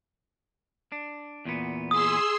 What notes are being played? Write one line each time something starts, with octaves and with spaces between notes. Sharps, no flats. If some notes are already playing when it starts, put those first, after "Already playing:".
D4
E2 A#2 B3
G#4 C6 D#6 E6